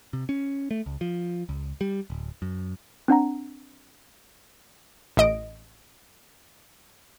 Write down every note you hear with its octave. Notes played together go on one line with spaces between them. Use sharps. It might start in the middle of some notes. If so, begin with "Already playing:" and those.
C3
C#4
A3
C#2
F3
C#2
G3
D1
F#2
C4 D4 F#5 A#5
A1 D#5 D7